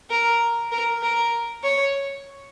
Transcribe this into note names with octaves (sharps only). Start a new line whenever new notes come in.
A#4
A#4
A#4
C#5